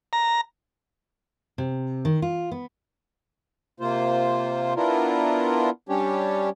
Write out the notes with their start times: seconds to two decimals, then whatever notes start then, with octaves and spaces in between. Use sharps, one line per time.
0.13 A#5
1.58 C3
2.05 D#3
2.22 F4
2.51 B3
3.80 C3 A#3 F4 C5
4.76 B3 D4 E4 F4 A#4
5.89 G3 C#4 D4 G4 C#5